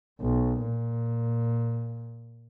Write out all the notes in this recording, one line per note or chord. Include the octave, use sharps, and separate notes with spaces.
B1
A#2